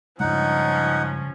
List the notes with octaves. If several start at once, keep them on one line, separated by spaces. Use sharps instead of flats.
G2 C#3 F3 G#3 C#4 D#4 F#5